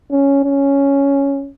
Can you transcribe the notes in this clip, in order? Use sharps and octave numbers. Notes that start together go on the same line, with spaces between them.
C#4
C#4